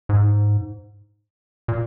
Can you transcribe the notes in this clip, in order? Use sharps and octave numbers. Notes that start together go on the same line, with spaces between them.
G#2
A#2